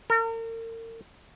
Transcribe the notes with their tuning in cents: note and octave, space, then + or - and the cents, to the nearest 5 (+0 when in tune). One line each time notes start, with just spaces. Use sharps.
A#4 -40